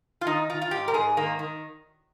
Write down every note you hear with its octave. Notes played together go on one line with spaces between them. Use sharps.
F4
D#3 D#4
D#3 F4
F4
G#2 G4
A#4
G#2 G#4
D#3 A#3
D#3